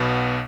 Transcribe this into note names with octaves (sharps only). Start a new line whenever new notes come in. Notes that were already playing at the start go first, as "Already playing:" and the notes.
Already playing: B1 B2 B3